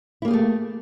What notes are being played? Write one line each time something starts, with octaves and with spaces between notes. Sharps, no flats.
A3 A#3 E4 G4 G#4